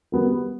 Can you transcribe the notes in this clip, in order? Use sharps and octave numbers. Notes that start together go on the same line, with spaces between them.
G3 B3 F#4 A#4